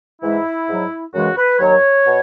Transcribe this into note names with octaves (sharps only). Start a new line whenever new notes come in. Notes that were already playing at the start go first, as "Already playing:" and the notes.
G#2 E3 G#3 E4
G#2 F#3
F#2 C#3 E3 G#3 F#4
B4
D#2 D#3 F#3 C#5
B2